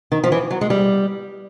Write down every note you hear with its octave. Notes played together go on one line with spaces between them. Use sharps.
D#3
F3
E3
F#3
G#3
G3